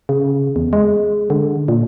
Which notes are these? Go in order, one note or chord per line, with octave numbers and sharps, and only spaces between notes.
C#3
E2
G#3
D3
A#2